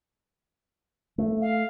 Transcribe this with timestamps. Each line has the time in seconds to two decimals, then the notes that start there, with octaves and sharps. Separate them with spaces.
1.18 A3
1.41 F5